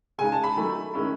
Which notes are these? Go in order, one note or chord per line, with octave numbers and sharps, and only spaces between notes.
C#3 G#3 D#4 G#5
A5
B5
D#3 F#3 A3
D#3 G#3 C#4 E4